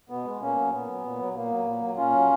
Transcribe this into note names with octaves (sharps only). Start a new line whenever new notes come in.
B2 B3
G#3
A#2 A#3 C#4
F#3
A#2 B3
F#3
A#2
F#3
A#2 A#3
F#3
A#2
F#3
A#2 C#4 F4
F#3